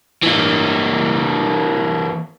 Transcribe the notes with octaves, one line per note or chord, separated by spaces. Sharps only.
E3 A#3